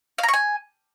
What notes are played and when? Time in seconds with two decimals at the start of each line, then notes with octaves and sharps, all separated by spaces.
0.18 F5
0.23 A#5
0.28 C#6
0.33 G#5